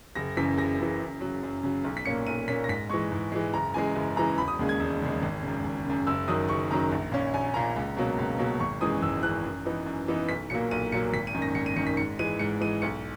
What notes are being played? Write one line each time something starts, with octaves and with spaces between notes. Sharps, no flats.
F#1 A#6
F#2 C#3 E3 B6
F#1 A#6
F#2 C#3 E3
F#2
C#3 F#3
F#2
C#3 F#3
B1
B6
A#2 A#3 C#4 C#7
B1 D#7
A#2 A#3 C#4 B6
A#6
G#2 B6
E3 G#3 C#6
G#2
E3 G#3
F#1 A#5
F#2 E3 G#3 G#5
F#1
F#2 E3 G#3 A#5
E1 B5
D#6
D#2 C#3 G#3
G#6
E1
D#2 C#3 G#3
G#1
C#3
F#2
G#1
F#2 C#3
F#1 E6
F#2 D#3 F#3 D#6
F#1 C#6
F#2 D#3 F#3 A#5
A#1
A#2 A#3 C#4
A#1 G#5
A#2 A#3 C#4 A#5
C#2
B2 F#3 A#3 C#4
C#2
B2 F#3 A#3 C#4
G#1 C#6
F#2 E3 G#3 D#6
G#1 E6
F#2 E3 G#3 F#6
F#2
E3 B3 D#4
F#2
E3 B3 D#4
B1 B6
A#2 F#3 A#3 C#7
B1 D#7
A#2 F#3 A#3 C#7
G#1 B6
D#7
F#2 D#3
A#6
G#1 C#7
D#7
F#2 D#3 C#7
B6
G#2 C#7
E3 G#3 D#7
G#2 C#7
E3 G#3 D#7
B1 C#7